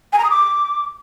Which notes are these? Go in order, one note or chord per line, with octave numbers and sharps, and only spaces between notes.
G#5
A#5
D#6
D6